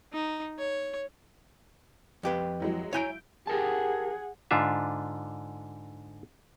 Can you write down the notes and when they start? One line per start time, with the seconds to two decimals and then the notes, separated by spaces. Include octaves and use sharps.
0.13 D#4
0.59 C#5
2.23 F2 G4 B4
2.60 E3 F#3 G#3
2.93 E4 C#5 G#5 A#5 G6 D7
3.47 G4 G#4 A#4 F#5 A5
4.51 G#2 D3 D4 F4 E5